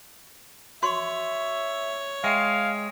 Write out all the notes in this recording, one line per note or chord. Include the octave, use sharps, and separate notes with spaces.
F#4 C#5 E5 C6 C#6
G#3 E5 F5 G5